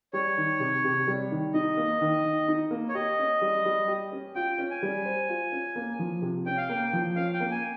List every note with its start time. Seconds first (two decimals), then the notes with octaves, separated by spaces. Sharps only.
0.13 G3 C#5
0.37 D#3
0.60 C3
0.84 C3
1.07 G3
1.31 D#3
1.54 D#4 D#5
1.77 A#3
2.01 D#3
2.25 D#3
2.48 D#4
2.71 A#3
2.89 C#5
2.94 G4 D#5
3.18 C#4
3.41 G3
3.65 G3
3.88 G4
4.12 C#4
4.35 F4 G5
4.59 C#4
4.70 G#5
4.83 G3
5.05 C5
5.29 F4
5.52 C#4
5.76 A#3
5.99 F3
6.22 C3
6.46 C#4 G5
6.57 F5
6.68 A#3 G5
6.93 F3
7.16 C#4 F5
7.34 G5
7.40 A#3
7.51 G#5